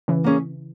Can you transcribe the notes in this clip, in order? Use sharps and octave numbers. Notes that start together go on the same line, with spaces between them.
C#3 E3
A#3 C#4 G#4